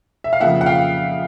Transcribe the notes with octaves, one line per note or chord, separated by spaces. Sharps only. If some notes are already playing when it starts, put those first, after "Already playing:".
E5
F5
F2 C#3 F3 A#3 E5 F#5
F#5
F5 G5